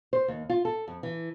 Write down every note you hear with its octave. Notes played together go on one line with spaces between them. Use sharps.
C5
D#2
F4
A4
F2
E3